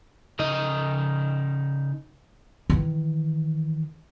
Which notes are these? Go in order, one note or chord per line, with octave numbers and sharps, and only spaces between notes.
C#3 D#4 D#5
D#3 E3